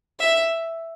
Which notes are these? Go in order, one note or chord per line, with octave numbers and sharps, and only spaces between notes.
E5